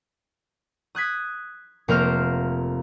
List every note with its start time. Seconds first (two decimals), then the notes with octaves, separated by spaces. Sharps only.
0.95 D#6 F#6 G#6 B6
1.88 F1 A#3 A#4 C5 F6 E7